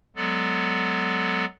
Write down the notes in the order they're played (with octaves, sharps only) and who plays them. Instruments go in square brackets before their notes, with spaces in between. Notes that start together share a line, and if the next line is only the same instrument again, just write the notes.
[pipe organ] F#3 G#3 B3 A4 D5